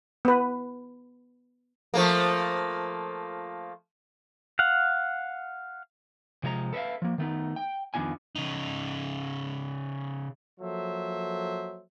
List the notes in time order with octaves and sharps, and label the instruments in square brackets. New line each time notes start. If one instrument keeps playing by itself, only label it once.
[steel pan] B3 B4
[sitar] F3 A3 A#3
[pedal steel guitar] F5 F#5
[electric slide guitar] C3 F3 G#3 D5 A#5
A4 B4 C5 E5 F5
F3 A#3
D#3 A3 B3 D#4
G5
F2 D#3 B3 D4 F4 G#5
[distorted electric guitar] C#3 D#4
[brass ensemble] F3 F#3 A#3 A4 C5 E5